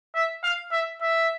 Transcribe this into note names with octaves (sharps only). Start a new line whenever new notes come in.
E5
F5
E5
E5